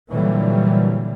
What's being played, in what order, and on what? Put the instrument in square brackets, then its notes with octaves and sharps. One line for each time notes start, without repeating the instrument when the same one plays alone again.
[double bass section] A#2 D3 E3 F#3 G3